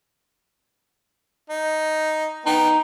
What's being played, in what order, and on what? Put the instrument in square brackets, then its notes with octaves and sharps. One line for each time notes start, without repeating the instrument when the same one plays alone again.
[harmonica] D#4
[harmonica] B3 G5 [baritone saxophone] D#4